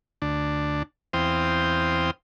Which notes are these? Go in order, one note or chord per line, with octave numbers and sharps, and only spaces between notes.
D2 D4
E2 C4 C5 F5 G5 D#6